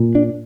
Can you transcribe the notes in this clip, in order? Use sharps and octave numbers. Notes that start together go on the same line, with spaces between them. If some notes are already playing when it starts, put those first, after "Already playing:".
Already playing: A#2
D4